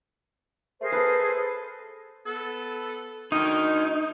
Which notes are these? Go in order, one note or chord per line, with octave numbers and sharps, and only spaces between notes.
A3 G#4 A#4 C5
A4 B4
B3 A4
D2 D#3 D#4